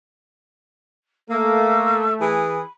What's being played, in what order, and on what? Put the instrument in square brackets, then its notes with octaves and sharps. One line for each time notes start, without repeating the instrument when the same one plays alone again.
[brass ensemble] A3 [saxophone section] A#3 [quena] E6
[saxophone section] E3 G#4 [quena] B5